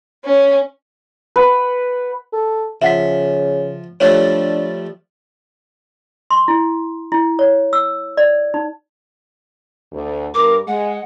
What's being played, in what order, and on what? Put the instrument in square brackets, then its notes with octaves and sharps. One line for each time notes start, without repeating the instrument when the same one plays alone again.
[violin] C#4
[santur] B4 F#5
[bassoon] A4
[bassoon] C#3 [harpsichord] F3 [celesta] E5 F#5 B6
[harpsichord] F3 G3 A3 [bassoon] D4 [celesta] C#5
[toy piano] C6
E4
E4
C#5
E6
D5
D#4
[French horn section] D2
[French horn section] G2 A#4 [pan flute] D6
[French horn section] G#3 [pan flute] F#5